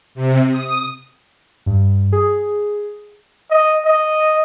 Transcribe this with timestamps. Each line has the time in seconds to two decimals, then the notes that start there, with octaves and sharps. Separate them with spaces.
0.15 C3
0.51 D#6
1.66 G2
2.12 G#4
3.51 D#5
3.85 D#5